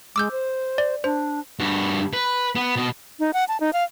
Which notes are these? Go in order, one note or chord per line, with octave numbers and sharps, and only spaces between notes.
G#3 D6 E6 G6
C5
D5
D4 C5
G2 F#4
B4
B3
B2 D#5
D#4
F#5
A5
D#4
F5